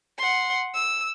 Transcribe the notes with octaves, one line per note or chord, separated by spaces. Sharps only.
F#5 C6
E6